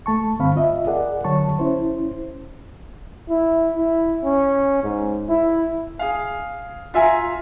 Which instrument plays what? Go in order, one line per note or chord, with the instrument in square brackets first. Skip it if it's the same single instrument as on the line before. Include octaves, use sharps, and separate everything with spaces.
[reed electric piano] A3 A5 C#6
G2 D3 C4 F5 B5
F4 D#5 E5
G#4 A#4 D5 F#5
D3 F#3 C#5 A5 C#6
C#4 E4 C5
[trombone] E4
E4
C#4
G#2
E4
[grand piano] G#4 F5
F4 E5 G#5 A#5